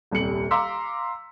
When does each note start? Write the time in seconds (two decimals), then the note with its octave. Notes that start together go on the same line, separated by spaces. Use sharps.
0.11 D#1 C2 G3 C#7 F#7
0.51 F5 A#5 C6 D6 E6 B6